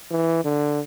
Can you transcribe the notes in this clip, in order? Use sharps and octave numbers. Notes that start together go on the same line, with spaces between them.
E3
D3